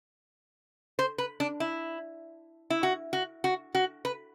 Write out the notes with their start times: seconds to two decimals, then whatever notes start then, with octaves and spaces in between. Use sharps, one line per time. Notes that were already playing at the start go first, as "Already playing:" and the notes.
0.99 C5
1.18 B4
1.40 D4
1.60 E4
2.70 E4
2.83 F#4
3.13 F#4
3.44 F#4
3.75 F#4
4.05 B4